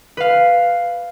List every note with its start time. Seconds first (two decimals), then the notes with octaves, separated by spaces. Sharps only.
0.17 B4 F5